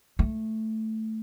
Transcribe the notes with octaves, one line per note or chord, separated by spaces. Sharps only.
A3